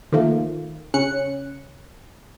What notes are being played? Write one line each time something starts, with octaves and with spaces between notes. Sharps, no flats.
D#3 F3 A3 A#3
C#3 C#4 F#6 C#7